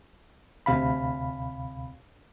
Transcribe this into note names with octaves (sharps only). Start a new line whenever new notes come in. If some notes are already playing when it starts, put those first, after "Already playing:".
D2 C3 F5 B5